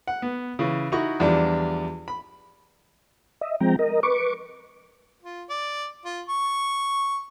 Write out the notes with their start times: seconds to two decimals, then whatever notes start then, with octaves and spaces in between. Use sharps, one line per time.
0.07 F#5
0.22 B3
0.59 C#3 E3
0.92 D#4 E4 F#4 C#6
1.20 E2 F3 G3 D4
2.08 B5
3.41 D#5 E5
3.60 F3 G#3 C4 G5 A#5
3.79 A#4 D#5
4.03 B4 C#6 D6
5.23 F4
5.50 D5
6.05 F4
6.29 C#6